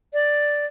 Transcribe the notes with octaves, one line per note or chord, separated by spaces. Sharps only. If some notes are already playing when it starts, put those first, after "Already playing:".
D5